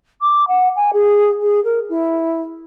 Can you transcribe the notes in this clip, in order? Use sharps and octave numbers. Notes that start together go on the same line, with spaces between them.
D6
F#5
G#5
G#4
G#4
A#4
E4